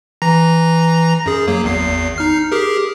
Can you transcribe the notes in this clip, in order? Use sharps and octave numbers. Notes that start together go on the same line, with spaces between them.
E3 A#5 A#6
F#2 G#4
F#3 A#3
G#1 E2 C7
D#4 F6 C7
G4 G#4 A#4